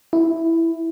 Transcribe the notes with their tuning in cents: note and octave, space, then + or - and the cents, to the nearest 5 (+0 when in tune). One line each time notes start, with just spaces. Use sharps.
E4 +0